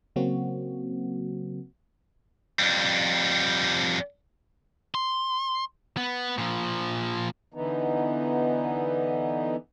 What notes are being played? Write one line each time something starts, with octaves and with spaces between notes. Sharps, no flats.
C#3 F#3 A#3 C4 F#4
F2 G3
C6
B3
A#2 F3
D3 E3 B3 D#4